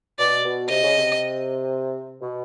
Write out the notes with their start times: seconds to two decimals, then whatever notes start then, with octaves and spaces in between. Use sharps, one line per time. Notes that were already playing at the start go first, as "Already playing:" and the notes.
0.19 B2 D5
0.44 B2
0.69 C3 D#5
0.83 C#3
0.96 C3
2.21 B2